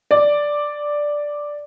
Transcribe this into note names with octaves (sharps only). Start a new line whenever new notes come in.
D5